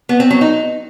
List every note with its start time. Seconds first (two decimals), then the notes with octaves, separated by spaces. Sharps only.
0.09 B3
0.20 C4
0.30 F#3
0.41 D#4